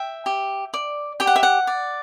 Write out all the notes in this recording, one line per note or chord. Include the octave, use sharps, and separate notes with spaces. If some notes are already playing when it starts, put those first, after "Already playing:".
Already playing: E5 G5
G4
D5
G4 G5
F#5
E5
F#5
D5